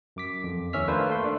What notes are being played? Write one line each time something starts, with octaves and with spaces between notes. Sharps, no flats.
F#2 D6 B6
F2
D#2 D#3 C#4 E5 F6 B6
A3 A#3 D4 F4 B4 C5
A3 C6
D4